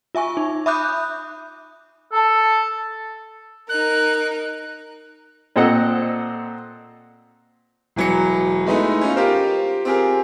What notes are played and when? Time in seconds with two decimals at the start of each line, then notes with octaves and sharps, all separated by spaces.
0.15 F4 E5 G#5 C#6
0.37 D#4
0.66 E5 B5 D6 D#6 F#6 G6
2.13 A4 A5
3.69 D#4 A#4 F#6
5.56 A#2 C4 A4 D#5 F#5
7.96 E1 E3 F#3 B4 C#7
8.66 G#3 A3 B3 D#4 E4
9.01 C#4 D#4 F4
9.15 F4 G4 A#4 C5 F5
9.85 C4 F4 G4 G#4 A#4